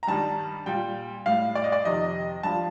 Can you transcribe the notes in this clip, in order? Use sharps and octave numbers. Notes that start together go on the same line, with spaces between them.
A#5
G2 D#3 G3 A5
A#2 G3 G5
A2 G3 F5
D5
D#5
D5
F2 C3 D#3 D#5
G2 F3 A5